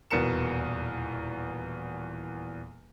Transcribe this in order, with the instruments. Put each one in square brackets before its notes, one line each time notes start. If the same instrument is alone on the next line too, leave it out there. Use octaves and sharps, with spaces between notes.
[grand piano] D#1 E2 B2 A#4 C#7 E7